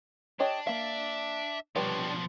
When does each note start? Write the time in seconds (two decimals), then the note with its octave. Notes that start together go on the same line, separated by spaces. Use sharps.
0.40 D4 G4 C#5 D#5
0.67 A#3 E5 F5
1.76 B2 F3 G3 D4 B4 C#5 G5